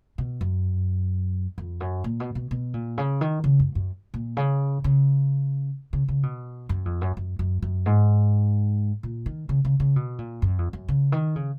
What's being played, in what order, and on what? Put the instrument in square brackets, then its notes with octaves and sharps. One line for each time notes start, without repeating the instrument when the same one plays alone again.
[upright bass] B2
F#2
F2
F#2
A#2
B2
B2
B2
A#2
C#3
D#3
C#3
F#2
F#2
A#2
C#3
C#3
C#3
C#3
B2
F#2
F2
F#2
F#2
F#2
F#2
G#2
A#2
D#3
C#3
C#3
C#3
B2
A#2
F#2
F2
F#2
C#3
D#3
C#3